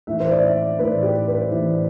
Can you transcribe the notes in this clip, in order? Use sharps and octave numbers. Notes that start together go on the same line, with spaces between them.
A2 E3 E5
C5
D5
E5
A2 E3 B4
G4
B4
A2 E3